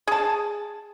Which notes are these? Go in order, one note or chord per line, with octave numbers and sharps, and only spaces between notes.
G#4 A5